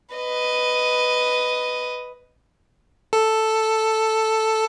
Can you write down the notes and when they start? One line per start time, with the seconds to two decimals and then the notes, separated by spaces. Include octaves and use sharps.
0.15 B4 D#5
3.13 A4